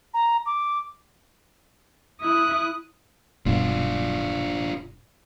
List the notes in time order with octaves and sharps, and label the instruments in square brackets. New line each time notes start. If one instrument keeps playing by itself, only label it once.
[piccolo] A#5
D6
[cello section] E4 [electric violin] D#6 F#6
[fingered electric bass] D#1 G2 B2 [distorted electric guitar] D4 F4